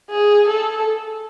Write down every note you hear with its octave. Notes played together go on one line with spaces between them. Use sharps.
G#4
A4